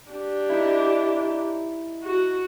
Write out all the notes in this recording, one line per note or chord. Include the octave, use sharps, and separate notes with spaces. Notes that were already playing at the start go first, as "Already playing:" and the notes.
D4 G4
D#4 E4
F#4